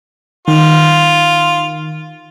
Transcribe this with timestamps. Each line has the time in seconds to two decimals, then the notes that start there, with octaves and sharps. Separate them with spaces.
0.48 D#3 F4